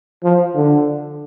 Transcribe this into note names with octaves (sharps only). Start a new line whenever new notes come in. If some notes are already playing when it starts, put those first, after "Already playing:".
F3
D3